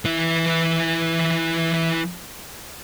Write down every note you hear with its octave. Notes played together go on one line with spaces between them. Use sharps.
E3 E4